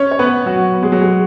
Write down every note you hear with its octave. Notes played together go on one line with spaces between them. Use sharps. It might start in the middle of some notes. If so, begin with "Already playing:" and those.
Already playing: C#4 C#5
C#5
B3 B4
F#3 F#4
B3
G#3
F#3
G#3